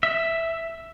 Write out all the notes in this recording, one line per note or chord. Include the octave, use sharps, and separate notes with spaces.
E5